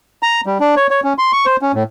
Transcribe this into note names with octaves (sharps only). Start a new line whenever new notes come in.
A#5
G3
D4
C#5
C#5
C#4
C6
C#6
C5
C#4
A2